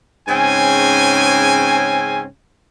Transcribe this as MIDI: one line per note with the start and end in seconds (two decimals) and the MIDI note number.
0.28 2.25 44
0.28 2.25 49
0.28 2.25 60
0.28 2.25 61
0.28 2.25 80